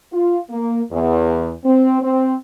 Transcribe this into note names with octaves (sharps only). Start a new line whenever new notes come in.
F4
A#3
E2
C4
C4